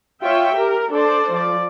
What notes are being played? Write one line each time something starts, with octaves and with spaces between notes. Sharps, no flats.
F4 C#5 E5 G5
G4 A#4
D4 A4 C5 D5
F3 D5